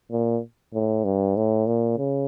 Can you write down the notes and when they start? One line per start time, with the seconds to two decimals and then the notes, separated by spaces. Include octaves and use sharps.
0.11 A#2
0.74 A2
1.05 G2
1.36 A2
1.67 A#2
1.98 C#3